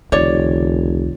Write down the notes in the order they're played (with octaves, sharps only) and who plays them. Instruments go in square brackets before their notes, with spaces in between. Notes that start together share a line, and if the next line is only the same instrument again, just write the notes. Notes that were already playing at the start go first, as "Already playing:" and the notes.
[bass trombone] F1 [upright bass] C#2 D#3 [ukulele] C#5 D5